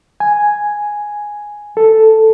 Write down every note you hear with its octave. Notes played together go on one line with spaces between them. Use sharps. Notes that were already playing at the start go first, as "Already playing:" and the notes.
G#5
A4